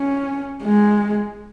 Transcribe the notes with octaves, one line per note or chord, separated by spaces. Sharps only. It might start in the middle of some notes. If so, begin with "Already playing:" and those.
Already playing: C#4
G#3